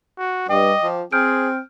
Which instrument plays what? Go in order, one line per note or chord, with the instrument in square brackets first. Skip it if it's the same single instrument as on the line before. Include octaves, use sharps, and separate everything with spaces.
[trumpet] F#4
[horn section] G2 [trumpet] D#5 [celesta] G5 D6
[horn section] F3
[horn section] C4 [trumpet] G#4 [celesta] F6 G6 D7